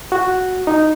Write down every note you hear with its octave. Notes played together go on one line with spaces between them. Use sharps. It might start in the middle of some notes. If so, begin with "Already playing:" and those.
F#4
D#4